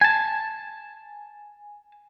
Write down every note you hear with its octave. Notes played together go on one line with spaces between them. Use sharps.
G#5 A5